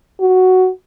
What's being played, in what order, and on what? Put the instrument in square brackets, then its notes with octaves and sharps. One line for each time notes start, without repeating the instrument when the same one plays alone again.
[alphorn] F#4